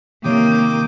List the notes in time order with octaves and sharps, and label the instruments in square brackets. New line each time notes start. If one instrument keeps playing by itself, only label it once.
[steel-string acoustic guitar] C3 D#3 C#5 [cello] A#3 [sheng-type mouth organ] G5 D6 D#6